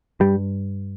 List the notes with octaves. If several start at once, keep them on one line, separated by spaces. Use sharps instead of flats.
G2 G3